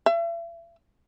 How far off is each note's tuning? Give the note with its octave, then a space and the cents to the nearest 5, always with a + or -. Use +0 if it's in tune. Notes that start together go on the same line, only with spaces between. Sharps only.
E5 +40